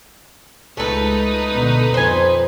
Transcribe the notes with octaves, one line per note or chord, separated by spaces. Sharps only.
C#2 A3 D#4 A4 B4
B2 D3
F2 C5 G#5